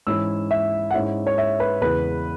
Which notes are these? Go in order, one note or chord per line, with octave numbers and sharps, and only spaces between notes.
G#2 E3 C#4 E4 E6
E5
F#5
G#2 G#3 C#4 E4 E5
C#5
E5
B4
E2 C#3 G#3 E4 B4